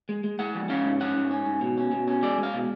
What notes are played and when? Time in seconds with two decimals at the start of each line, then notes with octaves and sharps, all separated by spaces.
0.09 G#3
0.24 G#3
0.39 G#3 F#5
0.55 F3
0.69 C#4 F5
0.85 G#2
1.01 C#4 F#5
1.16 G#2
1.31 C#4
1.46 G#2
1.61 B2
1.77 C#4
1.92 B2
2.08 C#4
2.23 G#3 D5
2.38 G#3 F5
2.54 B2